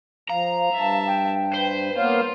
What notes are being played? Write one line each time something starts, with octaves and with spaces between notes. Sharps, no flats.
F3 F5 A#5
G2 E5 A5
G5
B4 C5
A#3 B3 F4 C#5 F5